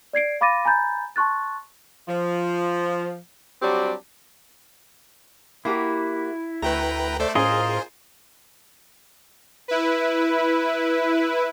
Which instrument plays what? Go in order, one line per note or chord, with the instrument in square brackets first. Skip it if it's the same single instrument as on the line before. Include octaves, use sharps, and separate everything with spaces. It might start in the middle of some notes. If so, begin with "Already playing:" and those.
[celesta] D5 G#6 C7 D7
F5 B5 D6 A6 A#6 D#7
G#5 A#5 B5 G6 A6
A5 C6 C#6 F#6 A6
[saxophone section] F3
F#3 G3 C4 D4 F#4 G4
[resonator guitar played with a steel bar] A#3 F#4 G4 [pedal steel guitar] E4
[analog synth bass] D2 [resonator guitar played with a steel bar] A3 F#4 [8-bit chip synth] B4 G5 A#5
[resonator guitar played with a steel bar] A3 [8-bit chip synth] A4 C5 D5
[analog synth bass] A2 [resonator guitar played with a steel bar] C#4 [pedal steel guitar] F4 A#4 D#5 [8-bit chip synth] G#4 C5
[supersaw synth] E4 B4